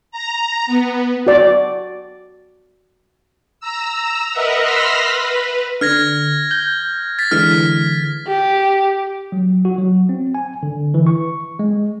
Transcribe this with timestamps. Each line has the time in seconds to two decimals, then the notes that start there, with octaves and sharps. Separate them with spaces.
0.11 A#5
0.67 B3
1.27 F#4 D5
3.60 A#5 E6
4.33 A#4 B4 D#5 E5 F#5
4.62 B5 C6 E6 F6 A#6 B6
4.95 B4
5.81 D3 F6 G#6 A#6
6.51 G6
7.19 A6 B6
7.31 D3 E3 G#3 F6 B6
8.27 G4
9.32 F#3
9.65 F#4
9.78 F#3
10.09 C4
10.35 G#5
10.63 D3
10.94 E3
11.07 C#6
11.59 G#3